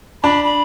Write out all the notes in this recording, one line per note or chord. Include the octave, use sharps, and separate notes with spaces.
D4 B5
B5